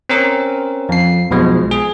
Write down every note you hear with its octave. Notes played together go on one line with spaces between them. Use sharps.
C4 C#4 A#4
F2 C7
B1 B2 F3 G#3
G#4